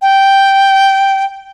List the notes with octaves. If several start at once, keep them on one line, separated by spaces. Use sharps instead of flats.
G5